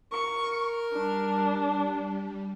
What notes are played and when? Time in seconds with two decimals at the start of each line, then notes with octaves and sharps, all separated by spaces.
0.12 A#4 C#6
0.93 G3 D4